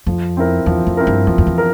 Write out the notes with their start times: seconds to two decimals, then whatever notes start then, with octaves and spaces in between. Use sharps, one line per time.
0.07 F2 F3
0.37 C4 E4 A#4
0.66 E2 F3
0.87 F2
0.97 C4 E4 A#4
1.07 G2
1.27 E2 F3
1.38 F2
1.47 E2
1.58 A#4